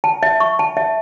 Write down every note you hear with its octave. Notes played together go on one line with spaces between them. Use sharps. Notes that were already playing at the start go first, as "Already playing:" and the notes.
A5
E5
C#6
A5
E5